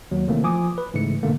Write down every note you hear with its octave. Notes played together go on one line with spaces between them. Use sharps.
D#2 F#3
C3 D#3 E3 A3 A#3 C4
F3 F4 G#5 D6 D#6
B4
G#2 C#3 E3 A3 C#7
G#2 B2 D3 A3 A#3